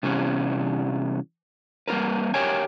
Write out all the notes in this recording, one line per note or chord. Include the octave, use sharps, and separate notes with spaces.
C3 E3 G3 B3 C#4
G3 A#3 F4 A#4 B4
G4 A#4 C#5 G5 G#5